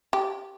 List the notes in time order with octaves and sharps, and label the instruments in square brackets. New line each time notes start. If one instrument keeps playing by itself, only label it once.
[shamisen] G4